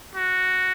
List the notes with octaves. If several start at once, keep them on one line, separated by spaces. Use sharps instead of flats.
F#4